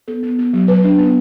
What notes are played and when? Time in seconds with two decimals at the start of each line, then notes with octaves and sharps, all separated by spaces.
0.08 B3 A4
0.23 B3
0.39 B3
0.53 F#3
0.68 F#3 B4
0.84 D4
0.99 B3